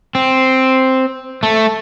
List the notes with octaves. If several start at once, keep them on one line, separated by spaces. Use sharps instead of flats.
C4
A3